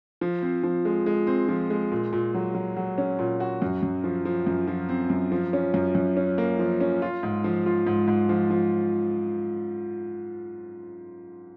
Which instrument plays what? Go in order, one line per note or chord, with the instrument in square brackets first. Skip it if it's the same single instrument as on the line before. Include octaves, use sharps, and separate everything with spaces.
[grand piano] F3
C4
F3
G#3
G#3
C4
F3
G#3
A#2
A#2
F#3
F#3
F#3
C#4
A#2
F#4
F#2
F#2
F3
F3
F#2
F3
C4
F#2
F3
C#4
F#2
F#2
C#4
A#3
F3
C#4
F4
G#2
F3
F4
G#2
G#2
F3
F3